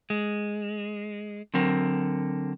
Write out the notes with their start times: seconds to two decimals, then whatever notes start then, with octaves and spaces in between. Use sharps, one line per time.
0.10 G#3
1.54 D3 F#3 C4 A#4